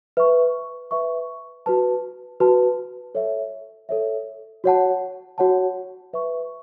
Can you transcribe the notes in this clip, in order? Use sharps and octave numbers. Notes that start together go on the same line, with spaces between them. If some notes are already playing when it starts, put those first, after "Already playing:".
B4 E5 C#6
B4 E5 C#6
F#4 B4 A5
F#4 B4 A5
A4 C#5 E5
A4 C#5 E5
F#4 C#5 F#5 A5
F#4 C#5 F#5 A5
B4 E5 C#6